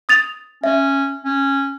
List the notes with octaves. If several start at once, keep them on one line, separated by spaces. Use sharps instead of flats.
D#6 A6 F7
C#4 E5
C#4